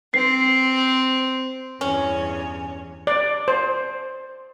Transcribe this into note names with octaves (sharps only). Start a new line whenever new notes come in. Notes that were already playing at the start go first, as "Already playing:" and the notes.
C4 C7
E2 G2 C#4 C#5
D5
C5